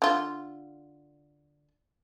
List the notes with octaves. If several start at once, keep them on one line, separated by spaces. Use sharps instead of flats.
D3 F4